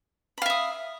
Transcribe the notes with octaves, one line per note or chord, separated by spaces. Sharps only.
E5 F5 B5 D#6